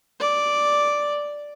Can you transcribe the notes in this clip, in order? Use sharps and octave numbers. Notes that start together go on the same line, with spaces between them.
D5